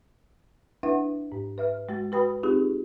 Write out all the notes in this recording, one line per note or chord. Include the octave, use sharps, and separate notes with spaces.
D4 E4 B4 E5 F#5
G#2
B4 E5 F6
G#3 F#4 A6
F#4 B4 G5 B5 D#6
C4 D#4 F4 G4 G#4